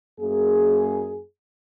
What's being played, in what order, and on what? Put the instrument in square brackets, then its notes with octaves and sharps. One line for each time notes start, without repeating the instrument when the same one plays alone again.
[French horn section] F#2 A#3 G#4